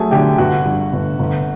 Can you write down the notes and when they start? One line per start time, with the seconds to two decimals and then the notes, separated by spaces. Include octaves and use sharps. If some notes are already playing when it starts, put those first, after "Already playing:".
Already playing: F#3 A3 G#4 G#5
0.11 D3 G4 G5
0.38 G1 F#4 F#5
0.65 G2
0.93 G1
1.19 G1